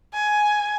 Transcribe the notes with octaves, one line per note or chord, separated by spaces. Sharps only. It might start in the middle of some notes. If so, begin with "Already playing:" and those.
G#5